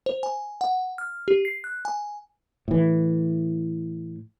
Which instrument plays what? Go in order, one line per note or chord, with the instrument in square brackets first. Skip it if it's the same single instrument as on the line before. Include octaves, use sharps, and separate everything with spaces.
[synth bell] C5
G#5
F#5
F6
G4
C7
F#6
G#5
[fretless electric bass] A2 E3